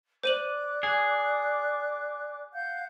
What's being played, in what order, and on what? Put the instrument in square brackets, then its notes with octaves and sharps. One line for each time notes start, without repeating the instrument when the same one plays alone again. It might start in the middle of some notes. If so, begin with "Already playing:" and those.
[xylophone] C5 D#7 F#7 [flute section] D5 D6 F#6
[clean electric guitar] G#4
[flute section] F5 F#5 G6